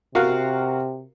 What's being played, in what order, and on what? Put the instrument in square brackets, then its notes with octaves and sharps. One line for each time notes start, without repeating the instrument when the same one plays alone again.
[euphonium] C3 [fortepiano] F#4 A#4 F5